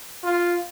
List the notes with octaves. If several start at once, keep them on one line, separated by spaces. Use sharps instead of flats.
F4